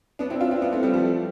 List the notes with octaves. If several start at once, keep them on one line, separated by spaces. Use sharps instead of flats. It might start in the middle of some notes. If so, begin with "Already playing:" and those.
B3 D4
C4 E4
D4 F4
C4 E4
B3 D4
A3 C4
G3 B3
F3 A3